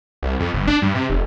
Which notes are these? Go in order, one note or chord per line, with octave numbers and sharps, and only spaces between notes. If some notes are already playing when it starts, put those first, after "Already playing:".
C2
F2
G1
D4
G2
C3
F1